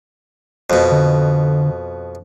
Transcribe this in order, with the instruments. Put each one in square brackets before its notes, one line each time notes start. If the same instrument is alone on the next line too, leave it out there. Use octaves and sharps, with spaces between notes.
[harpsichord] F2 B2
[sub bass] D3